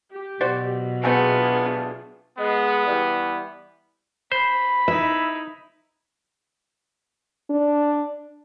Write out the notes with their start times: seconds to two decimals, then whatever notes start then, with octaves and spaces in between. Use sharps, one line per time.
0.12 G4
0.41 B2 F#3 F#4 C5 D5
1.04 G#3 A3 B3 C4 D4 F4 G#4
2.38 G#3 B3
2.86 E3 G3
4.32 C5 B5
4.88 D#4 E4 E5
7.50 D4